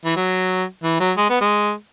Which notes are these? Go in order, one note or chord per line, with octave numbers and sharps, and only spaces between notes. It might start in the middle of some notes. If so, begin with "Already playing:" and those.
E3
F#3
E3
F#3
G#3
B3
G#3